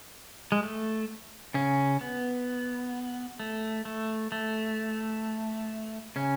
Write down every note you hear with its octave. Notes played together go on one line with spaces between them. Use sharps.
G#3
A3
C#3 C#4
B3
A3
A3
A3
C#3 C#4